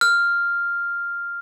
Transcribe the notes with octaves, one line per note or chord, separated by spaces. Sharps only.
F6